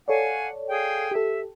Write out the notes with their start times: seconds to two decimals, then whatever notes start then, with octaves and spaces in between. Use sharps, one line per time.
0.08 A4 C#5 D5 F5 F#5 G#5
0.69 G#4 F5 G5
1.11 G4 A4 E5